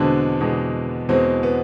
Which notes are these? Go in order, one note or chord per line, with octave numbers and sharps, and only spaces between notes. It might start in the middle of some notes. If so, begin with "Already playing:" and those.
Already playing: E2 B2 D3 G#3 C4 D4
E2 B2 G#3
E2 B2 G#3 C4
B3